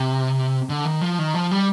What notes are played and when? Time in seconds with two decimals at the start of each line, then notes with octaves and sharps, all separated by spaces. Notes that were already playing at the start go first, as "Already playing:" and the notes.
Already playing: C3
0.69 D3
0.85 D#3
1.01 F3
1.18 D#3
1.34 F3
1.51 G3